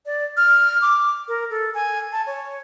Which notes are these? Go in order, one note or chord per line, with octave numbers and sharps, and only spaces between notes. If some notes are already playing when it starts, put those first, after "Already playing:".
D5
F6
D6
A#4
A4
G#5
A5
C#5